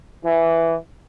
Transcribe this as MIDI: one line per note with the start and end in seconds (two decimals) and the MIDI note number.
0.24 0.76 52